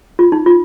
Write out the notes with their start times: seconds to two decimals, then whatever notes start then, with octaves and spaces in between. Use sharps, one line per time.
0.19 F4
0.32 D#4
0.46 F4